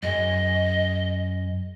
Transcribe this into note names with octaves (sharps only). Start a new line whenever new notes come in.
F#2 G#4 D#5 G#5